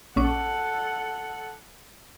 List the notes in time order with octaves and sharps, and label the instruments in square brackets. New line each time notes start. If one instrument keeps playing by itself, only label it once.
[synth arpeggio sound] A#1 C#4 D6 [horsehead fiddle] A4 F#5